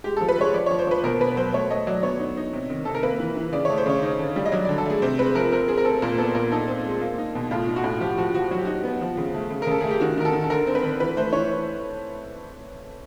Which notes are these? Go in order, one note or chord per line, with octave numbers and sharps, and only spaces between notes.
G#3 G4
A4
F3
B4
G#3 C#5
F3 D5
C#5
F3
C5
F3 B4
B2 A#4
B2 B4
F#3 C5
A3 C#5
A3 D#5
F#3 D5
B3 C#5
D#4
D#4
C3
D#3
C3 A4
A#4
A#3 B4
E3
E3
C#3 D5
C#5
A3
C5
C#3 C#5
D#4
D3
G3
D#5
F#3 D5
D5
D3
A4
A3 G#4
C3 C5
G#3 B4
F3 A#4
C4 A#4
C4 G#4
A#4
C4 A4
A#2 A#4
B3 A4
A#2 A#4
D#4 A4
C4
G#3
A#3
D#4
B2
A2 F4
D#4
F#4
A2
F3 G4
F3 F#4
F3 F#4
F#3 F#4
G4
D#4 F#4
B3
F3
C#3
A3
C#3
A#4
C#3 A4
A3 G#4
G4
D#3 F#4
D#3 A#4
A4
D#3
A4
D3 A#4
C4
B4
D3
E3 B4
A3 C5
E3 C#5